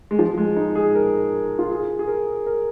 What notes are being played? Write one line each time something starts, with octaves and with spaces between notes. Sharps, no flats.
G#3
F3
G#3
D#4
G#4
A#4
F4
G#4
G#4
A#4
A#4